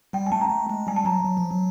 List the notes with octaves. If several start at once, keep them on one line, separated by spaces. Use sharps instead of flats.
G3 G5
G#5
A3 A5
A#5
A3
G#3
G3 G#5
A5
F#3 A#5
F#3
F3
F#3